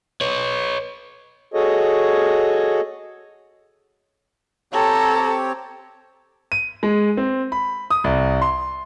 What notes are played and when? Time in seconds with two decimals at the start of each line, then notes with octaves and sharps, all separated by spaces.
0.21 B4 C#5
1.54 F#4 G#4 A4 C#5 D#5
4.73 C4 G4 A4 C#5 A#5
6.52 D#7
6.83 G#3
7.17 C4
7.52 B5
7.90 D#6
8.04 C2
8.42 C6